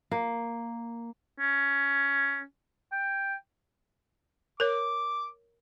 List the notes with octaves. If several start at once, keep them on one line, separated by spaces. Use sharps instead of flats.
A#3
C#4
G5
A#4 C#5 D6